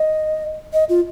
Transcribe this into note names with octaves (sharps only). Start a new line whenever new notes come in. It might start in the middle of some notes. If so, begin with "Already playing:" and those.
Already playing: D#5
D#5
F4